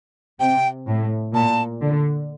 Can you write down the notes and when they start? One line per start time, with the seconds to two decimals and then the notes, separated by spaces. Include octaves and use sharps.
0.40 C3 G5
0.87 A2
1.34 A#2 A5
1.81 D3